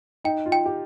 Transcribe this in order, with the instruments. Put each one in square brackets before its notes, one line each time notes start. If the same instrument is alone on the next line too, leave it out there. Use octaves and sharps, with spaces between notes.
[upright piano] D#4 [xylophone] G5
[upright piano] F4
[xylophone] G5
[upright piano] G4